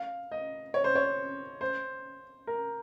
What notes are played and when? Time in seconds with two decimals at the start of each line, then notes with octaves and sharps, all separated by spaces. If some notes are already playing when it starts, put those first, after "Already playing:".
Already playing: F5
0.31 D#5
0.74 C#5
0.84 C5
0.95 C#5
1.61 C5
2.47 A#4